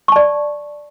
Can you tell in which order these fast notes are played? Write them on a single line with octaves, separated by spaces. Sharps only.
C#6 A5 D5